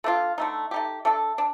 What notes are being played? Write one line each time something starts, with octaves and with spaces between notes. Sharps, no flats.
A3 D4 F4
D3 A3 D#4
A3 D#4 G4
A3 D4 A4
D4